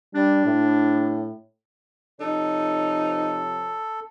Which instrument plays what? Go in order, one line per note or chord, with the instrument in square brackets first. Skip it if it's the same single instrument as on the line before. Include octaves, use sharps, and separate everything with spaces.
[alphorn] G3 [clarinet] D4
[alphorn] A2
[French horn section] C3 F3 C#5 [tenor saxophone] D#4 [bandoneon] A4